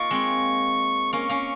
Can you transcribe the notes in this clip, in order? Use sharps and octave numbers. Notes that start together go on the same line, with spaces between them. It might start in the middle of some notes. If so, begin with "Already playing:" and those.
Already playing: A#3 D#4 F4 C#6
G#3 C4
A#3 C#4 C#6
A#3 C#4